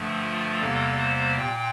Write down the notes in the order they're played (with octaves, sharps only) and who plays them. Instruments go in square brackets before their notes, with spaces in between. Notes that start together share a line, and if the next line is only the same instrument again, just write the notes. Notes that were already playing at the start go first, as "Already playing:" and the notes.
Already playing: [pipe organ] G2 D3 F3 A3
F4
E2 C3 G3 A#3 A4
C5
A#2 G5